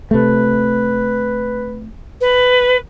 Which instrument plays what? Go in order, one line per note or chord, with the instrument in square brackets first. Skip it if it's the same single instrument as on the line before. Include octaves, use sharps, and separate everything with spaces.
[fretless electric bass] C3 A3 [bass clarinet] B4
[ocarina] B4